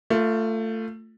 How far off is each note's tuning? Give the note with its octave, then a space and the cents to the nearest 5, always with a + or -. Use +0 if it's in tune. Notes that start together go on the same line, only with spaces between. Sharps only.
A3 +20 F4 +0